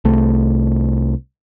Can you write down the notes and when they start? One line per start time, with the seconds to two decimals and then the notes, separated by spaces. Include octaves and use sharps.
0.05 C2 A3